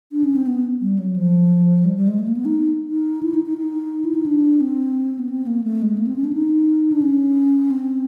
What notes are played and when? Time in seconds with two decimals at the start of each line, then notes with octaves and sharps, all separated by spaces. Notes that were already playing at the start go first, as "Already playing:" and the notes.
0.12 D4
0.24 C#4
0.36 C4
0.47 B3
0.81 G3
0.99 F#3
1.16 F3
1.85 G3
1.96 G3
2.08 G#3
2.19 A3
2.28 A#3
2.37 B3
2.45 D#4
2.88 D#4
3.23 E4
3.34 D#4
3.46 D#4
3.58 D#4
4.05 E4
4.15 D#4
4.26 D4
4.61 C4
5.19 B3
5.29 C4
5.47 A#3
5.64 A3
5.82 G#3
5.98 A#3
6.07 C4
6.16 C#4
6.24 D4
6.33 D#4
6.92 D4
7.02 C#4
7.70 C4